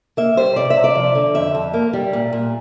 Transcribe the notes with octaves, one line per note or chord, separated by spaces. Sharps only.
A#3 E5
G3 C5
C3 D5
E5
C3
D5
F3
D3
F2 E5
F2
A#3
G3
A#2
A#2